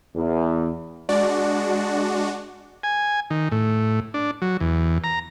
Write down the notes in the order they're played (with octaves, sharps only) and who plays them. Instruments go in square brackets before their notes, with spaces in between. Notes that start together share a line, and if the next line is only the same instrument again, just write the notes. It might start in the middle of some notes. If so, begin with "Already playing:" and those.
[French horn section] E2
[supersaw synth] G#3 D4 F#4 [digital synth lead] D5
[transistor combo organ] G#5
D#3
A2
D4
F#3
E2
A#5